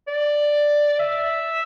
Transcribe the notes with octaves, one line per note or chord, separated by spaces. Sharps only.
D5
E5